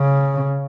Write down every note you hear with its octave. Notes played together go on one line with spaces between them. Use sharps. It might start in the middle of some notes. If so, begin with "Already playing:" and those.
Already playing: C#3